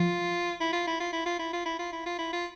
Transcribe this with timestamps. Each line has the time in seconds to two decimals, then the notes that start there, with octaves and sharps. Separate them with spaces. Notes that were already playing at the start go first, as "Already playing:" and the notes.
Already playing: F3 F4
0.60 E4
0.73 F4
0.87 E4
1.00 F4
1.13 E4
1.26 F4
1.39 E4
1.53 F4
1.66 E4
1.79 F4
1.93 E4
2.06 F4
2.19 E4
2.33 F4